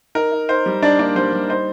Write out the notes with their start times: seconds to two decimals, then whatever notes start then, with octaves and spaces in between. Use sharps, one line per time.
0.15 D#4 A#4
0.32 D#4
0.49 D#4 C5
0.66 G3
0.82 D4 D#4 D5
0.99 A#3 D4 D5
1.16 G3 C5
1.33 G3
1.50 D#4 C5